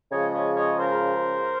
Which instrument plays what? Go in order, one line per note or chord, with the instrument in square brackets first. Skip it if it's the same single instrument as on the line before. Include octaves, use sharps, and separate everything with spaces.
[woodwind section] C#3 F3 G#3 C#5 D#5
C#5 D#5
C#5 D#5
A#4 C5